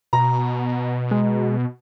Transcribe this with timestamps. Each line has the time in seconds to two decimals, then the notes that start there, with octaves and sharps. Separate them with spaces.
0.13 B2 A#5
1.11 G#3